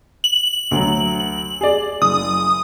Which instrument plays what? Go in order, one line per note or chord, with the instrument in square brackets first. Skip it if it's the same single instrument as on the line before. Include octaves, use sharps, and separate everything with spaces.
[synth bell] F#7
[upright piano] D2 F#3
G#4 D5
[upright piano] F#1 [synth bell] D#6